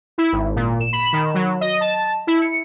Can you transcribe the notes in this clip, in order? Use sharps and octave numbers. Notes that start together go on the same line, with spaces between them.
E4
G#1
A#2
E7
B5
D#3
F#3
D#5
A5
E4
C#7